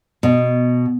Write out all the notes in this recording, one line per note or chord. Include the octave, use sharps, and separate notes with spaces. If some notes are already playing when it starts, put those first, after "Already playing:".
B2